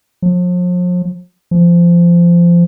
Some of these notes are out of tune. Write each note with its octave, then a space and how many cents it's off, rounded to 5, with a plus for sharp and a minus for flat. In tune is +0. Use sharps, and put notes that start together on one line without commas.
F3 +40
F3 -20